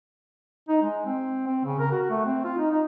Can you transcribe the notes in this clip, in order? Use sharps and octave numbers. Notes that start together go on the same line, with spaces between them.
D#4
G#3
C4
C4
C#3
A#4
F#4
A3
C4
F4
D#4
D#4